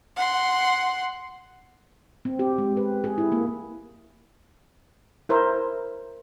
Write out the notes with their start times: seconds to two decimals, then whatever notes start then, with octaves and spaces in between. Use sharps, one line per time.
0.16 F#5 C6
2.25 C4
2.39 G4
2.58 G#3
2.77 B4
3.04 G#4
3.18 E4
3.32 A#3
5.29 E4 A#4 C5